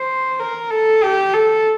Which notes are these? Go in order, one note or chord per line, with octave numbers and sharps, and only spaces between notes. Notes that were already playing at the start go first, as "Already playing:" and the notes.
Already playing: C5
A#4
A4
G4
A4